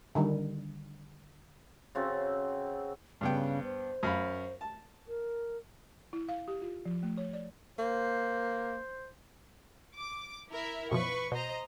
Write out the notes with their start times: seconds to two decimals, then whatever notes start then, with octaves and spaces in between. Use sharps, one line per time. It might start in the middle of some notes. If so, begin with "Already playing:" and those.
0.15 D3 D#3 G3
1.95 C#3 C4 F#4 A4
3.21 G2 C#3 B3 G5
3.64 C5
4.03 F#2 F5 B5
4.61 A5
5.08 A#4
6.13 E4
6.29 F5
6.48 G4
6.62 F4
6.85 F3
7.03 A3
7.18 C#5
7.33 D5
7.79 A#3 C5
9.95 D6
10.50 E4 A#4 E5
10.91 F#2 B2 F3 B4 C#6
11.32 B2 C5 D#5 A#5